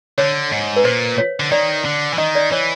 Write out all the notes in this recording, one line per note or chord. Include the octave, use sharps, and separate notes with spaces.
D3 C#5
G#2
B4
A#2 C5
C#5
D3
D#3 D5
D3
E3
D#3 D#5
D5
E3 C#5